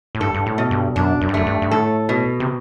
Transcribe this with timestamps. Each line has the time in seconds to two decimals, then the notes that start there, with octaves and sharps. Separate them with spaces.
0.15 A2
0.21 G2 A4
0.34 G2
0.46 A2
0.58 B2
0.71 G2
0.96 F#2 D4
1.21 F#2
1.29 G2
1.34 F#2 A3
1.46 G2
1.62 G2
1.71 A2 A4
2.09 B2
2.40 C3